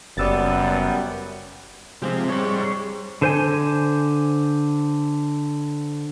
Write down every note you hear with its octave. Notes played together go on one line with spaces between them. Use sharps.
F#1 F#2 G3 B3 D5 E6 A6
C3 F3 G#3 C4 G4
G3 G#4 C5 C#5
D3 C5 G#5